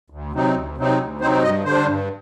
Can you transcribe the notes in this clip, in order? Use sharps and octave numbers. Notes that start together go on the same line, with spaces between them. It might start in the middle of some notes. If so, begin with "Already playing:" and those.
D2
C3 F#3 C4 D#4
D2
C3 F#3 C4 D#4
D2
C3 F#3 C4 D#4 C5
G2 D#5
D3 G3 D4 C5
G2